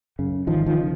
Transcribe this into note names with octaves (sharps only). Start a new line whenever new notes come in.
F#2 C#3
G#1 D#3 F3
D#3 F3
C#3